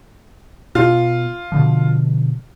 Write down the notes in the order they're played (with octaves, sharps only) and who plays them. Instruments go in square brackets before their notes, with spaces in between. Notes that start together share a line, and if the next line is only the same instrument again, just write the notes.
[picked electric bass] B2 [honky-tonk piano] F4
[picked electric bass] B2 D3 F3